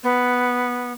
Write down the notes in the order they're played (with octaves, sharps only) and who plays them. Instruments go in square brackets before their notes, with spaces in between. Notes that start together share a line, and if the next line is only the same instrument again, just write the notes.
[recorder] B3